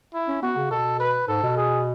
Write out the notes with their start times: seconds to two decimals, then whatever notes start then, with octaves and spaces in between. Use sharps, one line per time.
0.14 E4
0.28 C#4
0.42 B3 F#4
0.56 C#3
0.71 B2 A4
1.00 B4
1.28 G#2 A4
1.43 B2
1.57 G#4